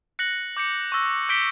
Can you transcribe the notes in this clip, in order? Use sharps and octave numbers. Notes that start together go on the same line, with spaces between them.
F#6 A#6 C#7 F#7
D6 G6 C#7
C#6 E6 A#6
D6 G6 B6 D7 G7